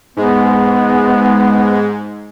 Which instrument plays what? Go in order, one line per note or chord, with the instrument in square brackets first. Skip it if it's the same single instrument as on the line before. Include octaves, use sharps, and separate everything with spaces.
[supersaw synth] G#2 G#3 [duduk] B3